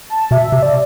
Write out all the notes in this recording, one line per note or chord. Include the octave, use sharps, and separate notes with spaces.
A5
B2 E5
C3
D5